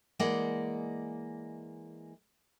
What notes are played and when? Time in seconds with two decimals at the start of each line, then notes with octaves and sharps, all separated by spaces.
0.19 E3 G#3 A#3 D5 D#5 F#5